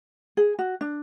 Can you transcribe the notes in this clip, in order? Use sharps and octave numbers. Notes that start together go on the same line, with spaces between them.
G#4
F#4
D4